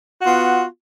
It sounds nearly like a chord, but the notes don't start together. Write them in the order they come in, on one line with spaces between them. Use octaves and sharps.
F#4 F4 B3